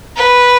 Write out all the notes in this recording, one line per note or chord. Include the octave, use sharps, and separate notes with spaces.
B4